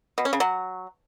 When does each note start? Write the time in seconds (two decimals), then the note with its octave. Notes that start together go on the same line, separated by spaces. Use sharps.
0.18 B2
0.25 C#4
0.33 C#3
0.40 F#3